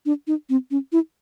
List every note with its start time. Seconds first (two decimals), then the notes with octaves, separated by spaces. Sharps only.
0.06 D4
0.27 D#4
0.49 C4
0.71 C#4
0.92 E4